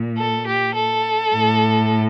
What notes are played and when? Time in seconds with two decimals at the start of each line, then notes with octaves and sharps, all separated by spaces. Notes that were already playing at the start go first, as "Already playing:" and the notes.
Already playing: A#2
0.18 A4
0.47 G4
0.75 A4
1.34 A2